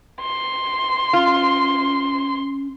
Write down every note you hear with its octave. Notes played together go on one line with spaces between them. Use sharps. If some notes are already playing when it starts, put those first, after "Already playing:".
C6
C#4 F4